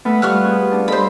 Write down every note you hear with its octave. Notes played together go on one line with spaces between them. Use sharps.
A3 B3 A4 F6
G3 A3 F4 C#6 F6 F#6
C4 G#4
D4 F4
G3 A4 C5 D#5 B5